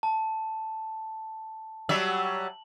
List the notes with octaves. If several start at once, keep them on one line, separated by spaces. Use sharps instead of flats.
A5
F#3 G3 E5 F#7